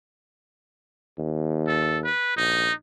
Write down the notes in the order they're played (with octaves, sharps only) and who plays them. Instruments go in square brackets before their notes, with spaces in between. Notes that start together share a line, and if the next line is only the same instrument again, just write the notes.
[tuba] D#2
[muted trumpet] A4
B4
[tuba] A#1 [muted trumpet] D#4